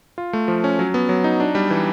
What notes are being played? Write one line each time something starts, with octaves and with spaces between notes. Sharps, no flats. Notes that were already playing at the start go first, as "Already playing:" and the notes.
F4
A3
F3
C#4
F#3
B3
F#3
D#4
D4
G3
E3